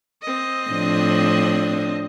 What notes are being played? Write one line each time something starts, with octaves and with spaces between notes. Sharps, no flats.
C4 D#5
A2 F3 D4